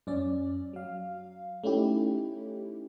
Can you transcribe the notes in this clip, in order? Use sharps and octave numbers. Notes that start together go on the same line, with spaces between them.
F#2 C#4 D5
F#3 F5
A3 C#4 D#4 E4 G4